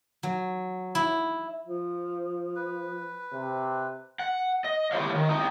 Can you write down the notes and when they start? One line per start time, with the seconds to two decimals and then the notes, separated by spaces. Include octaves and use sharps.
0.23 F#3
0.95 E4
1.65 F3
2.56 B4
3.33 C3
4.19 F#5
4.64 D#5
4.92 E4 G4 C5 C#5 F5
5.10 C3 D#3
5.29 C4 D#4 E4 G4 D#5 A#5